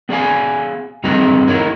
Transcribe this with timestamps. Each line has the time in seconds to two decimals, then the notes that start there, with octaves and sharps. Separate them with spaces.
0.09 B3 G#4 D5 F5 G#5
1.04 G2 C4 D#4 G#4 B4 D#5
1.48 D#4 E4 A#4 C#5 D#5